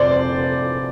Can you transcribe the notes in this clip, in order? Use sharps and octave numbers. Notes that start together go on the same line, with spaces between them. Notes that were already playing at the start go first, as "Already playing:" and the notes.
Already playing: F1 C5 D5